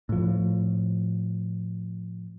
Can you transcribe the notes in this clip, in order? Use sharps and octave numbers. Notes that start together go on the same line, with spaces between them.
A2 F3